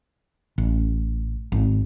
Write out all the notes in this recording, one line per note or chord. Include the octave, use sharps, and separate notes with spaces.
A1
G#1